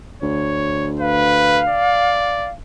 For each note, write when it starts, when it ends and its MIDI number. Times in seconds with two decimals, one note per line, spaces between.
0.22 1.73 38
0.22 0.90 73
1.00 1.62 71
1.00 2.52 77
1.69 2.49 74